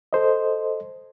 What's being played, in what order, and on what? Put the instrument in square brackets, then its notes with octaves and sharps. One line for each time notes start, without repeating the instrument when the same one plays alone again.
[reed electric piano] A4 C5 D#5